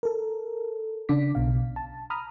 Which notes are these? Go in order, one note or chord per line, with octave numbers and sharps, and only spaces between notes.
A4 A#4
C#3 D4 D6 B6
B1 B2 F5
A5
A#5 B5 D#6 F6